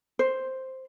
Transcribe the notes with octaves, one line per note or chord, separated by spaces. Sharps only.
C5